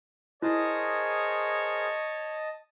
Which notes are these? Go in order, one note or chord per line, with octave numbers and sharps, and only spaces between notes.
E4 G#4 A#4 C5 C#5 D#5 A5